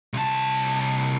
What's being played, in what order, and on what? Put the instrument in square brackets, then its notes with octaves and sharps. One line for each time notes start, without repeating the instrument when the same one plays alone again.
[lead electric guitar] C2 A5